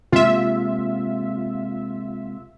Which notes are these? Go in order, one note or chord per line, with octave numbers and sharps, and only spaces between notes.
C3 G#3 A#3 F4 E5